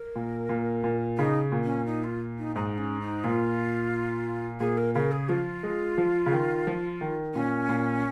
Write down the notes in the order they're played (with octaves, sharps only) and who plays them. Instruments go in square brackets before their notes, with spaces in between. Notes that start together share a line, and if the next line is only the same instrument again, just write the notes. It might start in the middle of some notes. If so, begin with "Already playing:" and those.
Already playing: [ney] A#4
[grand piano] A#2
A#2
A#2
[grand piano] C#3 [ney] D#4
[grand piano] A#2
[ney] C#4
D#4
F4
D#4
[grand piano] G#2 [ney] D#4
[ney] C#4
D#4
[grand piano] A#2 [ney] F4
[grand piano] A#2 [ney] G#4
[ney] A#4
[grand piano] C#3 [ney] A#4
[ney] G#4
[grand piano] F3 [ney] F4
[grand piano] G#3
F3
C#3
D#3
F3
D#3
[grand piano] A#2 [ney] C#4
[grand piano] A#2